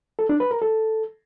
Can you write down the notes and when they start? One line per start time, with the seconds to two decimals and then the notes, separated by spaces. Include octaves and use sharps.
0.19 A4
0.29 D4
0.40 B4
0.51 A#4
0.62 A4